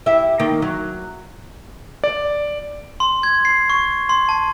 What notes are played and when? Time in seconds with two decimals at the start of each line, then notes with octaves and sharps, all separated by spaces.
0.06 E4 G4 E5
0.40 D#3 A#3
0.62 F#3
2.04 D5
3.00 C6
3.23 G#6
3.45 C7
3.70 C#6
4.09 C6
4.29 A5